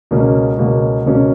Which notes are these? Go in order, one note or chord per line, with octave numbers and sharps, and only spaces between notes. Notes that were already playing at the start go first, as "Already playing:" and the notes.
C#2 B2 A#3 C#4 F#4
C#2 B2 A#3 C#4 F#4
C#2 B2 A#3 C#4 F#4